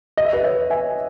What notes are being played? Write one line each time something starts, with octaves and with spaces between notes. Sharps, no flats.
D#5
E5
B4 D#5
C#5 E5
E5 G#5